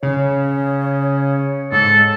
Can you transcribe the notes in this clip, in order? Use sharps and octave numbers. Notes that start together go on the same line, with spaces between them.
C#3 C#5
G#2 A4